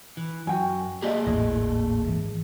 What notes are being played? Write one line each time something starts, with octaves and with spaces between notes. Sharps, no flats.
E3
F#2 F#4 G5 G#5
A3 A#3 G4 G#4 D#5 E5
G#1 D#2 A2 E4 D#5
G#2 E3 G#3